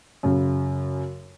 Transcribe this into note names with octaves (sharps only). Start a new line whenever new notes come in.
F#2 C#3